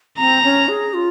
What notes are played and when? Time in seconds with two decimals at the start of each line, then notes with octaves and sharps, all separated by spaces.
0.18 C4 A#5
0.44 C#4
0.68 G#4
0.94 F4